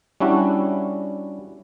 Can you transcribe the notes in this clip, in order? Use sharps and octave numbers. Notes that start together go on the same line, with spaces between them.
G3 C#4 D4 E4 F#4